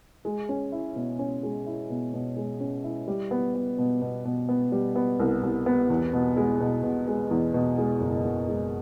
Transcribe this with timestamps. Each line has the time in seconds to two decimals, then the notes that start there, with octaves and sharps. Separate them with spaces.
0.25 G#3
0.49 C#4
0.72 E4
0.96 B2
1.19 C#4
1.43 G#3
1.66 E4
1.90 B2
2.14 B2
2.37 G#3
2.60 C#4
2.84 E4
3.08 G3
3.31 B3
3.55 B3
3.78 B2
4.02 B2
4.25 B2
4.49 B3
4.72 G3
4.96 B3
5.19 C2
5.43 C2
5.66 B3
5.90 E2
6.13 B2
6.37 G#3
6.60 B2
6.83 B2
7.08 G#3
7.31 E2
7.54 B2
7.78 G#3
8.01 F#1
8.25 F#1
8.49 G#3